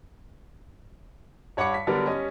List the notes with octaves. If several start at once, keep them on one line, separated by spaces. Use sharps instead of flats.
G2 C#5 F#5 B5 D6 C#7
B6
D3 F#3 G3 B3 A#4 D5
G3 C#4 D#5